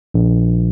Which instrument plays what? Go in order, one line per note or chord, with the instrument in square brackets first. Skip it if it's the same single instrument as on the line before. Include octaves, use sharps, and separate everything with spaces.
[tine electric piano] A#1